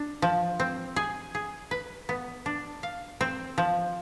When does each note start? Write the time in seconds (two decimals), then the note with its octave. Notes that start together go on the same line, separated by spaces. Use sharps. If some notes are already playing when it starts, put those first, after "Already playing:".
Already playing: D4
0.22 F3
0.60 C4
0.96 G#4
1.35 G#4
1.71 B4
2.09 B3
2.46 D4
2.83 F5
3.21 C4
3.58 F3